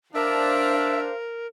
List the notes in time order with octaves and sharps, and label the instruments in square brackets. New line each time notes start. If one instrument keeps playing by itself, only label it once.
[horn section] D4 [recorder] A#4 [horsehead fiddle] C5 F5 [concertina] E5